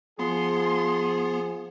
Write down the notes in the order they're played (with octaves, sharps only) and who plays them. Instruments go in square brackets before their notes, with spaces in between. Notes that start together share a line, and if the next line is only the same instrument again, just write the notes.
[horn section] F3 G#4 [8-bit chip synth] B3 [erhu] C6